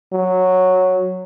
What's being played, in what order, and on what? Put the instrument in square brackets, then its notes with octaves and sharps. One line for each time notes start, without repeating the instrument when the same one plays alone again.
[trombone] F#3